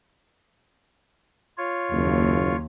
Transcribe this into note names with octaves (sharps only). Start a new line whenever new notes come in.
F4 C#5
F#1 D#2